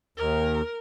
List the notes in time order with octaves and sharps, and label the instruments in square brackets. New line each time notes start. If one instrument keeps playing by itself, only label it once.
[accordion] D#2 [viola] A#4